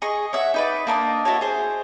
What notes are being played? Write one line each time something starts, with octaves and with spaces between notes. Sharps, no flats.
G#4 D#5 C#6
C#5 E5 F#5
D#4 B4 D5
A#3 D4 A4 D#5
E4 F#4 A4 C#5
G#4 C5